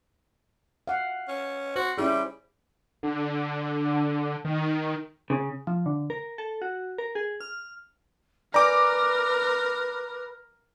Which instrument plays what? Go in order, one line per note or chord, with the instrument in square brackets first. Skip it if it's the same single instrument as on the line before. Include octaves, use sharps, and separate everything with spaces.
[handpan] F5 F#5
[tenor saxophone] C#4
[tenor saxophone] F#4 [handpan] C5
[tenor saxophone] G3 [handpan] C#4 E4 G#4
[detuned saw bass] D3
D#3
[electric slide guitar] C#3
[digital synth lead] F3
D3
A#4
A4
F#4
A#4
G#4
F6
[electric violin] A#4 [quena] B4 [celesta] D5 G#5 [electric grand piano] A#5 D6